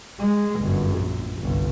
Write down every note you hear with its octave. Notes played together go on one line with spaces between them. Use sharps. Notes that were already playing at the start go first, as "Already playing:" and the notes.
G#3
G1 F#2
A#1
G1 C2